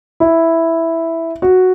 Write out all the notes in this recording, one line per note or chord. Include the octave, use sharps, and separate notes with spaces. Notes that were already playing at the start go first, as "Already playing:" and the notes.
E4
F#4